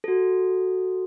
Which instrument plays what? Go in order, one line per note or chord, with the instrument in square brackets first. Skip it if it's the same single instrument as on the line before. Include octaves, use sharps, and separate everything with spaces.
[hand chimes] F#4 A4